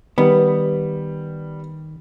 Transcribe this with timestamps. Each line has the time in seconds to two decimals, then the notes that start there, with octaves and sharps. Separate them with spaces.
0.18 D#3 G3 B3